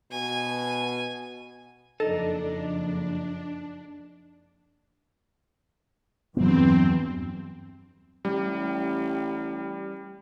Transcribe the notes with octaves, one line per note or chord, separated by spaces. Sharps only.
B2 G#5
F#1 F2 D4 D#4 A4 A5
E2 G2 F#3 B3 C4
A1 G3